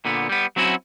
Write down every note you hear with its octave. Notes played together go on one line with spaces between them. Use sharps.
A#2 D3 B3
G3 B3
F#3 C4 C#4 E4 F#4